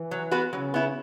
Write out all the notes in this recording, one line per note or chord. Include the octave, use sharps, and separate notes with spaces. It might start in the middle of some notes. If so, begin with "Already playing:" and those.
Already playing: E3
F#3
B3 F#4 B4
C#3 F#3
B3 E4